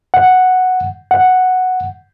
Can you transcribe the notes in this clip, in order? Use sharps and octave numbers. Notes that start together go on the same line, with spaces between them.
F#5
F#5